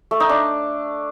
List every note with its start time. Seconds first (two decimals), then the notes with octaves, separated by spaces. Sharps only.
0.11 A3
0.20 D#4
0.29 D4